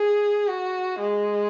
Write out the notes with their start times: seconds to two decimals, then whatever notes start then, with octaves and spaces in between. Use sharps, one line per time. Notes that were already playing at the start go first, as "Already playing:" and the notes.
Already playing: G#4
0.48 F#4
0.99 G#3